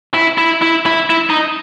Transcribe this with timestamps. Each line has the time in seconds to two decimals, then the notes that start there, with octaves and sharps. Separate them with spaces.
0.14 E4
0.38 E4
0.62 E4
0.86 E4
1.10 E4
1.30 D#4